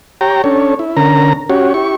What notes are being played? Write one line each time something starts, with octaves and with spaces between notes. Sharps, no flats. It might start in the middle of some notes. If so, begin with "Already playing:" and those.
G4 C#5 G5 A#5
C#4 D4 A4 C#5
E4
D3 C#4 A#4 A#5
C#4 F#4 G4 C#5
E4 G4 C#6